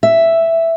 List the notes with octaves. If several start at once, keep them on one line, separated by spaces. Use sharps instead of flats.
E5